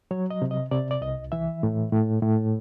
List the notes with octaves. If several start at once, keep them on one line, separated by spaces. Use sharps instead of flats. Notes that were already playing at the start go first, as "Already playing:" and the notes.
F#3 C#5
D#5
C3
D#5
C3 D5
D5
C2 D#5
E3 E5
A2
A2
A2